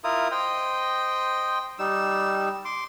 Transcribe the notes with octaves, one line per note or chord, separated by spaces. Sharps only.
E4 F4 A#4 D#6
C5 D#5 G5
G3 D#4 E6
C6 D6